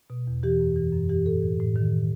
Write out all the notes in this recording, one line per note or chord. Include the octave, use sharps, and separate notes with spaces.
B2
E2
E3 G4
F#2
E3
F#2
E3 G4
A2 A4
E3
A2
D#3